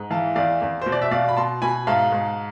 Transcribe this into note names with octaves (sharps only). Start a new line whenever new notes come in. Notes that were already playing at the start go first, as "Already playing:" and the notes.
Already playing: G#2
E3 F5 A5
E2 D5 F5
E2
B2 C5
D5
E5
B2 D5 F5
B5
B2 A5 C6
B2 G#5 B5
G#2 F5 A5
G#2